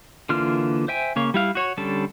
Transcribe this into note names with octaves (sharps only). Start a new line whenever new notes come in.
D3 E3 A#3 F4 F6
C5 E5 G5 G#5
C#3 A#3 C#5
G3 E4 F5
F#4 C#5
D3 G3 C#4 A4 A5